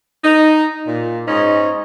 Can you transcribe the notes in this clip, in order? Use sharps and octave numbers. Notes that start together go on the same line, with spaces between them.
D#4
A#2
G#2 G#3 C#4 D#4